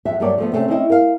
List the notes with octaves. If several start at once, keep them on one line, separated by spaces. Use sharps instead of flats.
F2 E5 F#5
G2 F#3 G3 A#3 C#5 D5
F3 A3 B3
C3 A3 C4 C#4
C4 C#4 E4 D#5
A#4 F5